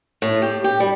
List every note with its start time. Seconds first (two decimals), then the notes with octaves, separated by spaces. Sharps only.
0.22 A2
0.42 G4
0.64 G4
0.80 G3